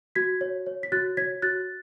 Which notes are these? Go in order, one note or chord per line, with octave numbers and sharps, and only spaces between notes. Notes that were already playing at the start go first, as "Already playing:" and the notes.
F#4 G#6 B6
C#5
C#5
B6
F#4 F#6 A6
C#5 G#6 B6
F#4 F#6 A6